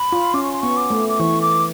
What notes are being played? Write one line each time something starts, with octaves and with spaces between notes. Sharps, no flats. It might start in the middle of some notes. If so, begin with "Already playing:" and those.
Already playing: B5
F4
C#4 D6
C#6
C6
B3 C#6
D6
A3
D6
E3 C#6
D6